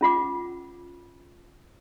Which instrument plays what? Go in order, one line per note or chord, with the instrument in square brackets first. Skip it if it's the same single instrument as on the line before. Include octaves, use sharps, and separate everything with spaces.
[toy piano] C#4 F4 F#5 D6